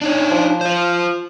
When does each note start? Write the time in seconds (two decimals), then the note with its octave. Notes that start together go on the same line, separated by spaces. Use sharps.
0.01 D4 D#4 C#5
0.31 F3
0.61 F4 C5